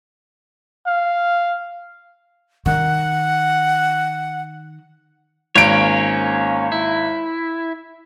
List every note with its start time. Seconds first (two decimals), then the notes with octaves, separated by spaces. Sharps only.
0.87 F5
2.66 D#3 F#5
5.55 G#1 A#3 C#4 C#5 D7
6.72 E4